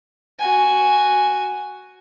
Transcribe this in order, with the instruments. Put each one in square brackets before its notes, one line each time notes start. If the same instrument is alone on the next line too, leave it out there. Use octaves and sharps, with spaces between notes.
[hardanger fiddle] F#4 G#5